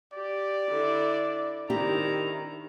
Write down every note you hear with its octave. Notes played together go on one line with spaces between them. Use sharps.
G4 D5
D3 E4
D#3 C4 D4 E4 G4 A#5